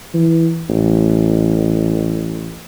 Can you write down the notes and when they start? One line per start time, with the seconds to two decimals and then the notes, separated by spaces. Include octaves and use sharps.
0.14 E3
0.69 A1